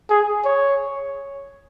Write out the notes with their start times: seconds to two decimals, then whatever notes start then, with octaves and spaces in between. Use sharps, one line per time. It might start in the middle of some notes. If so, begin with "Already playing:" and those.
0.10 G#4
0.45 C#5